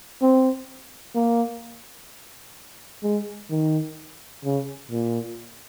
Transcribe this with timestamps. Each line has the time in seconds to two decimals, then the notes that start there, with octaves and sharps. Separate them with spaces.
0.22 C4
1.15 A#3
3.03 G#3
3.50 D#3
4.44 C#3
4.91 A#2